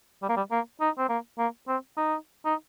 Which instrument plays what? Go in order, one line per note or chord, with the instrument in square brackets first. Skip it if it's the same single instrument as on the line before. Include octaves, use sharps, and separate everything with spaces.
[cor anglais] G3
A#3
G3
A#3
D#4
C4
A#3
A#3
C4
D#4
D#4